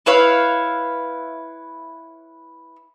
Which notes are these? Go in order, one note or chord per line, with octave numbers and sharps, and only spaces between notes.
E4 B4 C#5 F5